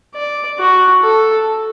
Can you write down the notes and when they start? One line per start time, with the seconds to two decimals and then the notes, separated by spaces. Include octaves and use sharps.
0.15 D5
0.59 F#4
1.03 A4